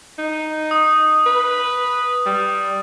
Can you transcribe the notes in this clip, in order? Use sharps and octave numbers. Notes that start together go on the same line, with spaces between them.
D#4
D#6
B4
G3